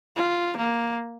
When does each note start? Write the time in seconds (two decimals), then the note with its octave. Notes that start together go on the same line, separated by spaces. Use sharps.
0.16 F4
0.57 A#3